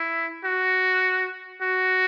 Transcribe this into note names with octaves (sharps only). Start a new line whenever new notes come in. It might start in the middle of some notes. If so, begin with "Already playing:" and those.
Already playing: E4
F#4
F#4